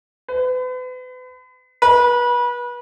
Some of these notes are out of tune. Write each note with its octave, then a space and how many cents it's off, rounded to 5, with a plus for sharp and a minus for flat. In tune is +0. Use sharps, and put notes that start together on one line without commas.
B4 +40
B4 -30